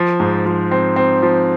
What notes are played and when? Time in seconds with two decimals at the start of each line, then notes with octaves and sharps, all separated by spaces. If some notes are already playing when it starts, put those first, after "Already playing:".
Already playing: F3
0.20 G#2
0.45 F3
0.71 C4
0.96 C4
1.22 F3